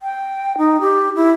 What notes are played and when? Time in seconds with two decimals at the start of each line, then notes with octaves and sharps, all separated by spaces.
0.01 G5
0.58 D#4
0.81 G4
1.16 E4